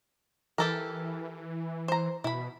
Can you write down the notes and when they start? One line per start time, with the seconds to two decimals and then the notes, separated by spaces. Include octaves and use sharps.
0.58 E3 G4 A4 A#4
1.88 C5 A#5
2.24 B2 E4 B5